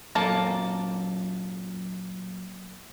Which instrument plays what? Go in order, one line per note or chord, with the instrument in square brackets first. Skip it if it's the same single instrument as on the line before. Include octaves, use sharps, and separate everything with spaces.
[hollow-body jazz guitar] F#2 A#2 A4 [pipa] A#3 A5